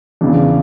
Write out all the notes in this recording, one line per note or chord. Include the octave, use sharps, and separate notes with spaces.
E2 C#3 E3 D4